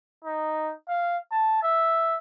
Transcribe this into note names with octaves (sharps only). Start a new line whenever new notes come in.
D#4
F5
A5
E5